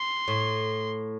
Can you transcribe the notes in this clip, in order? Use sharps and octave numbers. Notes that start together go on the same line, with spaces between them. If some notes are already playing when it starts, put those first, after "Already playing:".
Already playing: C6
A2